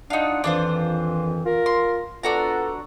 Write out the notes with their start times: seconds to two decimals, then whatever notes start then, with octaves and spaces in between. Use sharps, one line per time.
0.10 D4 D#4 F4 F#5
0.44 F2 D#3 E3 D4 F4 C5
1.44 F4 A#4
1.66 C6
2.23 B3 D4 F4 F#4 A4 A#5